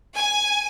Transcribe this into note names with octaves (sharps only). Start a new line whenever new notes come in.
G#5